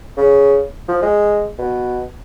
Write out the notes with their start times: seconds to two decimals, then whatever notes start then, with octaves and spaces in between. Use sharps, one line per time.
0.17 C#3
0.89 F3
1.03 G#3
1.59 B2